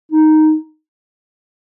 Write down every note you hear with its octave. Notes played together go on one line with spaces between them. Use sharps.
D#4